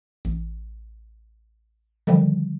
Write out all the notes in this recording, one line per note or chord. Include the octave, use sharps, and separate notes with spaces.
A1
D3 D#3 F3 G3